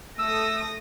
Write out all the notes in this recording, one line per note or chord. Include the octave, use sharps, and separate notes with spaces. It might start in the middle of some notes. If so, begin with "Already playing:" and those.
A3 D#6 E6 A#6